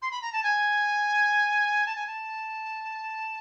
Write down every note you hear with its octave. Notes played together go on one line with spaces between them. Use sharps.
C6
B5
A#5
A5
G#5
A5
G#5
A5